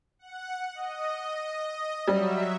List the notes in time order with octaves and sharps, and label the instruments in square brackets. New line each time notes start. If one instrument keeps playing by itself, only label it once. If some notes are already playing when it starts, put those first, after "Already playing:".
[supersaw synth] F#5
D#5
[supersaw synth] F#3 E5 [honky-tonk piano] G3